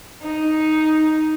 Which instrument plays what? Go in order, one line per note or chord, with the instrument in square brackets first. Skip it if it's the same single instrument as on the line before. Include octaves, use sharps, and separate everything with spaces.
[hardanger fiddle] D#4